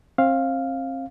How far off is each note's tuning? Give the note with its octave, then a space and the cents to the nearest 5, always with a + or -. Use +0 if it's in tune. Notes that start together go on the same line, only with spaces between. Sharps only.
C4 +35 F5 +0